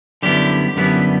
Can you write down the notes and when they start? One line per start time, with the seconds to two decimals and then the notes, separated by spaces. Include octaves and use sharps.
0.23 F#2 D3 G3 B3 E4 G4
0.76 F#2 D3 G3 B3 E4